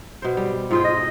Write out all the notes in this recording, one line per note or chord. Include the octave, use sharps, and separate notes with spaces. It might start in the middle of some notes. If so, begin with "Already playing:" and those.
B2 C5
G3
G#2 F4 G#4 G5
D#5